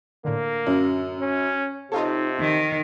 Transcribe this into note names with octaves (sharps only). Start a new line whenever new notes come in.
A2 D3 A#3
F#2
C#4
C3 D#4 F4 A4 C#5
D#3